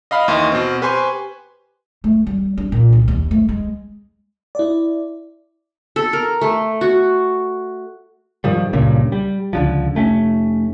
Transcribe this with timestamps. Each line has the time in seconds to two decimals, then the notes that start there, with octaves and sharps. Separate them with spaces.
0.11 D#5 F5 B5 F6
0.28 D#2 E3 D#5 C6 C#6
0.52 B2 C4
0.82 G4 B4 C5 G#5 C6 C#6
2.04 A3
2.27 G3
2.58 D4
2.72 A#2
2.92 C2
3.08 D#2
3.31 A3
3.49 G#3
4.55 E4 D5
5.96 A4
6.13 A#4
6.41 A3
6.81 F#4
8.44 G#2 D#3 F3 G3
8.73 C#2 G2 A#2 C#3
9.12 G3
9.53 C#2 D3 F3
9.95 F1 A3 C#4